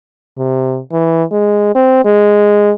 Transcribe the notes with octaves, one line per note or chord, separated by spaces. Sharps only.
C3
E3
G#3
C4
G#3